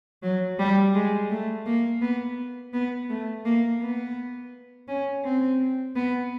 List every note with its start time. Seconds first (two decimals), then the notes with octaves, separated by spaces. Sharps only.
0.23 F#3
0.58 G3
0.94 G#3
1.30 A3
1.66 A#3
2.01 B3
2.73 B3
3.09 A3
3.45 A#3
3.81 B3
4.88 C#4
5.24 C4
5.95 B3